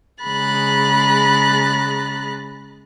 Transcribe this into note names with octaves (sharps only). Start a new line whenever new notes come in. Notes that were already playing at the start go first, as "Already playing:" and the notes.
C#3 G#3 A#5 B5 F#6 A6